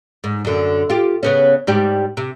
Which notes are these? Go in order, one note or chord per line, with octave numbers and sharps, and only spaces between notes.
G#2
F#2 D3
F4 G4
C#3 B3 C#4
G#2 G3 G4
C3